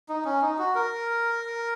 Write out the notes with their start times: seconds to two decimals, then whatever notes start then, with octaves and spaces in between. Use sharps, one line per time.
0.09 D#4
0.25 C#4
0.42 D#4
0.59 F#4
0.75 A#4